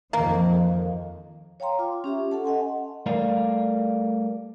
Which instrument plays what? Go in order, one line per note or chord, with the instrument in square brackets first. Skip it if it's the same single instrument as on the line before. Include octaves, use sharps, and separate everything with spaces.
[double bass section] F2 D#3 [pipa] A#3
[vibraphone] C#5 F5 G5 A#5 C6
F4 D6
C#4 G4 E5
C#4 A4 F#5 A5
D#5 F#5 G#5 C6
[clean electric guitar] G3 A3 A#4 D5 F5